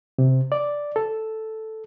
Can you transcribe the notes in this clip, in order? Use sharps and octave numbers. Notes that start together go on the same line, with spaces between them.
C3
D5
A4